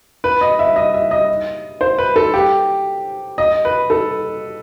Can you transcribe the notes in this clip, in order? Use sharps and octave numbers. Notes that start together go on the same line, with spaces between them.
B4
D#5
E5
D#5
E5
D#5
C5
B4
A4
G4
D#5
B4
A4